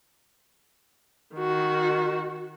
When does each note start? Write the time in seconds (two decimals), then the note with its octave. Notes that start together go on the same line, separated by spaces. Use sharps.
1.36 D#3 F#4